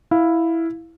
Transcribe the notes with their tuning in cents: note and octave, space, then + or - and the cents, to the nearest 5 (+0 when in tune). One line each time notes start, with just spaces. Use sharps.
E4 +0 F5 +0